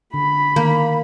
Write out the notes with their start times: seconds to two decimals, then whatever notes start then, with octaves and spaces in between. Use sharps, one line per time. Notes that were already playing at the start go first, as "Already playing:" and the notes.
0.14 D3 B5
0.56 D#3 A#3